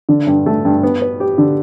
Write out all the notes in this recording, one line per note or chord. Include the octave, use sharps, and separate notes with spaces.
D3
G2
A3
G2
B3
B4
G4
D3